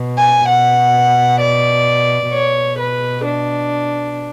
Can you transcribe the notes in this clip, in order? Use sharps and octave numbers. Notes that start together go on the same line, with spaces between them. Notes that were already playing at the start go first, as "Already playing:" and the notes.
Already playing: B2
G#5
B2 F#5
D5
B2 C#5
B4
D4